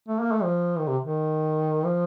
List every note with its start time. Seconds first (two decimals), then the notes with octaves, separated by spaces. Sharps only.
0.08 A3
0.20 A#3
0.32 A3
0.43 F3
0.78 D#3
0.88 C3
1.04 D#3
1.85 F3